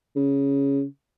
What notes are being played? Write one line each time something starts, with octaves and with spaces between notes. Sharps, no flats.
C#3